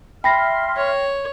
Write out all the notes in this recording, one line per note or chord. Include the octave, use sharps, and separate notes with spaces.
E5 G5 B5 C6 F6 A#6 C7
C#5